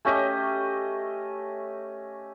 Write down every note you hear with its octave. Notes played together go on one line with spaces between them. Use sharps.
A3 C#4 G4 D#5